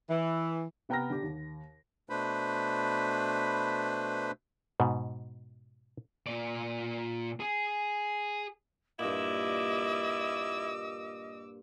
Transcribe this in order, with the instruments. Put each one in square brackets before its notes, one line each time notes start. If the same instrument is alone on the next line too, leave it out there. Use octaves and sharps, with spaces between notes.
[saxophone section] E3
[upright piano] C3 B3 G5 A#5 F6 A#6
D3 G4
D#2
[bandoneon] B2 A3 D4 B4 C5 B5
[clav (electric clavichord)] G#2 B2
[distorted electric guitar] A#2 D5
G#4
[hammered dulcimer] G2 A#2 [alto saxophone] E4 [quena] D#5 [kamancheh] D6 E6